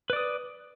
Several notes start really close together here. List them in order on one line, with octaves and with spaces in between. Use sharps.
B4 D5 D#6